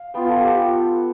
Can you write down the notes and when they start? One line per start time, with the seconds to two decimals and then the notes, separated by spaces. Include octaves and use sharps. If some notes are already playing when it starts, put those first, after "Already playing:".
Already playing: F5
0.14 B3 F4 G5
0.29 A4
0.42 G4